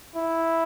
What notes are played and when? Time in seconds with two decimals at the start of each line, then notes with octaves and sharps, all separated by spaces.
0.16 E4